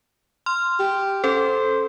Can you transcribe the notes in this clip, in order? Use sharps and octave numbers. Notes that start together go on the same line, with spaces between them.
C6 F6
G4
C#4 A4 C5